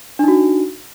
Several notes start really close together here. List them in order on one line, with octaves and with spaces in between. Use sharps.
D4 D#4 F#4